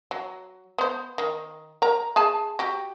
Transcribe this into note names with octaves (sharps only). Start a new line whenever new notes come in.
F#3
B3 C5
D#3
A#4 A#5
G#4 G#5 A5
F#4 G4